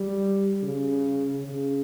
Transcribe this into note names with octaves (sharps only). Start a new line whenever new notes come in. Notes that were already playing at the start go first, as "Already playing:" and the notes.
Already playing: G3
C#3
C#3